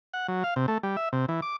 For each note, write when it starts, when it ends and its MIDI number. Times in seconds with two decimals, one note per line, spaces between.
0.13 0.27 78
0.28 0.44 54
0.44 0.54 77
0.56 0.66 48
0.68 0.78 57
0.83 0.96 55
0.97 1.09 76
1.13 1.26 48
1.29 1.41 52
1.42 1.56 86